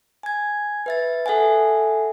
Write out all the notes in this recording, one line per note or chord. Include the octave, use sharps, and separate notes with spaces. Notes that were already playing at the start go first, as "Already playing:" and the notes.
G#5 G#6
B4 E5 A6
A4 E5 F#5 G#5